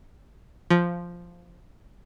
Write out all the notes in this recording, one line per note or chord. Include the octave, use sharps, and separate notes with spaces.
F3